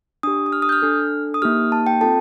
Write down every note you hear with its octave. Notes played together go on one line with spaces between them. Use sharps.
D4 G4 D#6
D#6
F6
D#6
G6
F6
D4 A4
D#6
A#3 D#4 G4 F6
A5
G5
C4 F4 A4 A5